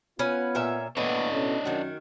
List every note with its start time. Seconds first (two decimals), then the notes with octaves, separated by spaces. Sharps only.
0.19 B3 C#4 F4 B4
0.55 A#2 C#4 E5
0.97 A2 A#3 B3 D4 B4 C#5 D#5
1.32 B2 A3 C#4
1.65 F#2 D#3 F#4